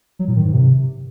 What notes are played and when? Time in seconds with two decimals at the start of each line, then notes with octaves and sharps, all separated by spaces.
0.19 F#3
0.28 A2
0.36 D#3
0.44 G#2
0.53 C3